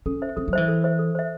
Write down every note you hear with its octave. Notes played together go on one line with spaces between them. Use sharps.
C#4 A4
C5 E5
C4 A4
F#3
E3 C5 E5
A4
C5 E5
A4
C5 E5